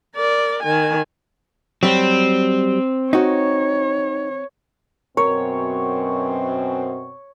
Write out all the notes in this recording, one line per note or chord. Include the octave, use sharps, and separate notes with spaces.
A#4 D5
D#3 G#5
F#3 G3 C4
D#4 F#4 C#5
F#2 B2 C4 A#4 C#5